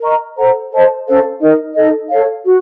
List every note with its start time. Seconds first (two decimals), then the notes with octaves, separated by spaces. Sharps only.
0.01 A#4 D#5 A#5 C#6
0.37 A4 C5 F#5 A#5
0.71 A4 C5 D#5 A5
1.06 C#4 A4 C5 F5
1.40 D#4 A#4 D#5
1.74 D#4 A4 D#5
2.09 A4 C#5 F5
2.45 F#4